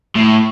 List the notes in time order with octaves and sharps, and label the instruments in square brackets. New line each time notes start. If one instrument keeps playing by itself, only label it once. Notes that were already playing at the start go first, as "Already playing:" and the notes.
[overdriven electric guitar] A2